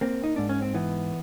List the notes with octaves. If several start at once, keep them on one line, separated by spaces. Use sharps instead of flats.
A#3 C4
D#4
G#2 D4
C#4
C4
E3 B3